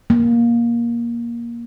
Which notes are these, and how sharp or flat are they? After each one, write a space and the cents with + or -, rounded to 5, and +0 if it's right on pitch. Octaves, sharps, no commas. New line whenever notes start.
A#3 +15